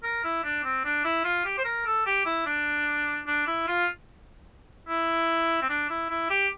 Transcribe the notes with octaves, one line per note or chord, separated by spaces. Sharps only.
A#4
E4
D4
C4
D4
E4
F4
G4
C5
A#4
A4
G4
E4
D4
D4
E4
F4
E4
C4
D4
E4
E4
G4